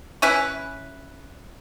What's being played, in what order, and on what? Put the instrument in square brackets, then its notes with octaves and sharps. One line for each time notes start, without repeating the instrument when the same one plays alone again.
[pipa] C#4 E4 B4